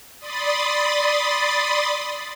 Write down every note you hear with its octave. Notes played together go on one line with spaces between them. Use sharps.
D5 B5 C6 D#6 A6